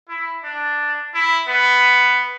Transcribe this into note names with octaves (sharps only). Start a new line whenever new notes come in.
E4
D4
E4
B3